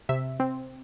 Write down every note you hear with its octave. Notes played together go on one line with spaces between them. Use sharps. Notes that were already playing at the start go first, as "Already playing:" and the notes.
C3 E5
C4